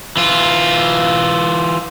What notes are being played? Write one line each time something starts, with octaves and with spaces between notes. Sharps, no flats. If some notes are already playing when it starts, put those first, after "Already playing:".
E3 F4